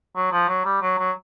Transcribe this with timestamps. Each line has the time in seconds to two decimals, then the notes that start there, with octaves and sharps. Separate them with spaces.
0.16 F#3
0.32 F3
0.48 F#3
0.65 G3
0.82 F#3
0.99 F#3